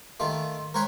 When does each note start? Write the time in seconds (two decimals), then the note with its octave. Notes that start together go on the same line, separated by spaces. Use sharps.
0.20 D#3 A3 F4
0.74 A#4 C5 C#5 F#5 G#5 B5